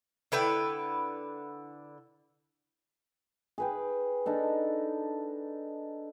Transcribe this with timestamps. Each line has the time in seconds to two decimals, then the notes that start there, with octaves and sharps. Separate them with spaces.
0.32 D3 E4 B4 G5
3.58 G#4 B4 G5
4.26 D4 D#4 A4